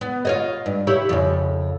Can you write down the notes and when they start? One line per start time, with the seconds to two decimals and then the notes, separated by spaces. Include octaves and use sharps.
0.01 B3
0.25 F4 C#5 D#5
0.66 G2
0.87 E4 G4 C#5
1.09 F2 C#3